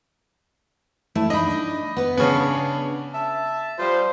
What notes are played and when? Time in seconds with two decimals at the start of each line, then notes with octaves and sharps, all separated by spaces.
1.15 A3 E4
1.30 D4 D#4 D#5 B5
1.97 B3 B4
2.17 C#3 B3 D4 C#5 G#5
3.13 E5 A5
3.78 F3 G3 C5